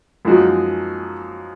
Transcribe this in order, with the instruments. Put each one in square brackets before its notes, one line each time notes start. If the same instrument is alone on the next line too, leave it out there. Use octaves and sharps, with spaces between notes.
[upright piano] F#2 F3 G#3 D#4 F#4